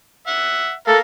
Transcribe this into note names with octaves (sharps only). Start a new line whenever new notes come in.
E5 F#5
A4 A#4 F5